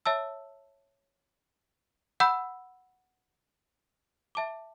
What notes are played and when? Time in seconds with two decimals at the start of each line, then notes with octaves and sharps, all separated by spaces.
0.05 C#5 E5 A5 E6
2.20 F#5 B5 E6 G6
4.35 E5 A5 D6